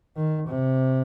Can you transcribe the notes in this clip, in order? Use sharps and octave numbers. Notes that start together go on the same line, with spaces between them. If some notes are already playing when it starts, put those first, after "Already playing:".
D#3
C3